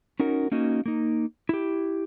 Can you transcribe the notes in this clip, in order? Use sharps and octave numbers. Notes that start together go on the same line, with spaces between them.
C#4 D#4 F#4 A#4
A#3 C#4 D#4 F#4
A#3 D#4
E4 G4